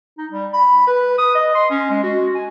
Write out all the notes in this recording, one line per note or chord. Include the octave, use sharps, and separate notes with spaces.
D#4
G3
B5
B4
D#6
D#5
C6
C#4
G#3
F#4
G#5